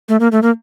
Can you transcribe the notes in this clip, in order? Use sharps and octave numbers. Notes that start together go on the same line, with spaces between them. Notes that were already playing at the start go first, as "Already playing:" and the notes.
A3
A#3
A3
A#3